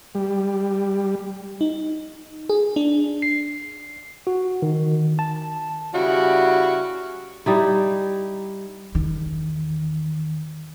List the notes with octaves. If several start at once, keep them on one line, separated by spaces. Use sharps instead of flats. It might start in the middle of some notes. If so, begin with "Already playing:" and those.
G3
D#4
G#4
D4
C7
F#4
D#3
A5
C#3 G3 E4 F#4
G3 D#4 E4
E2 D#3